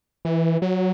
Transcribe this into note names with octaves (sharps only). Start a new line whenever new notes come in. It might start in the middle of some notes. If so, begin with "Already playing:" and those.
E3
F#3